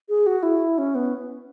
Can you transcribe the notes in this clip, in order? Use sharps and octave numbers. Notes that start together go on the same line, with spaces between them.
G#4
F#4
E4
C#4
B3